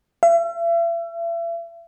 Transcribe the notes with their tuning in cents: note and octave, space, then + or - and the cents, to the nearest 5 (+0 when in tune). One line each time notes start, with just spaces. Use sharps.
E5 +40